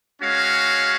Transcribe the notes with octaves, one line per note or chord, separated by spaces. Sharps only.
G#3 C#4 F#4 C#5 F5